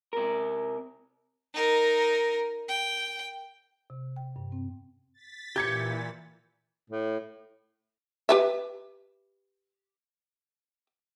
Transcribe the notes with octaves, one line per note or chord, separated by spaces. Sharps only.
C3 A#4
D#4 A#4
G5
C3
G5
G2
C4
A6 B6
A#2 E3 G4 G6 G#6 C#7
A2
G4 B4 E5